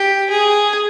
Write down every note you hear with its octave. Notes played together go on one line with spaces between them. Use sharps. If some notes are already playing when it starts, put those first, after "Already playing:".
Already playing: G4
G#4